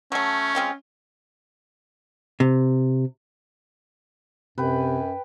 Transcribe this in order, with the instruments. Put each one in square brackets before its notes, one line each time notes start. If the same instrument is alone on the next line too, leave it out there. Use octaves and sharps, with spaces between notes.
[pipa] F#3 A3 [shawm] C#4
[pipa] G#3 C4 F4
[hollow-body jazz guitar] C3
[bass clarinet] F#2 [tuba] C3 [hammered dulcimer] B4 G5